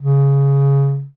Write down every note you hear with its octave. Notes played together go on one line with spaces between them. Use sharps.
C#3